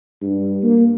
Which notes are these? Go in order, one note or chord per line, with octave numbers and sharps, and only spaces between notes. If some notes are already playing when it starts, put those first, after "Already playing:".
G2
A#3